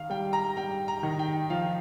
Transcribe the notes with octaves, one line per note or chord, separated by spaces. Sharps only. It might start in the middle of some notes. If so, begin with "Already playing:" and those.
Already playing: D#3 F5
G3 G5
A#5
G3 G5
A#5
D#3
G5
F3 F5